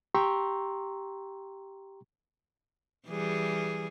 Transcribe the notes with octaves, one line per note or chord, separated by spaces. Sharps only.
G4 G5 A#5 C6 C#6 E6
E3 G3 G#4